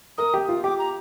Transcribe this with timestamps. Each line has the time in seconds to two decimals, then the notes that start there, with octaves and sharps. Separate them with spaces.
0.18 A#4 D#6
0.34 G4
0.49 F4
0.64 G4 D6
0.79 A#5